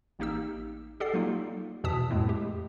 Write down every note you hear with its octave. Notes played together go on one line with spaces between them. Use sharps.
A1 A#3 D#4 G4 E6
G4 A4 D5 F#5 C7
F#3 A#3 D#4 F4
E2 B2 E3 A5 D#6 B6
F2 A2 G#3 A3
G4